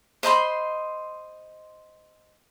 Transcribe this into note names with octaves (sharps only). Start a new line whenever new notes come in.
C5 D#5 B5 C6